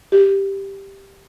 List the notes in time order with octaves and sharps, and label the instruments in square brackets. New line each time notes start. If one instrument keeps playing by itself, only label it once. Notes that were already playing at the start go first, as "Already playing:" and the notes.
[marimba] G4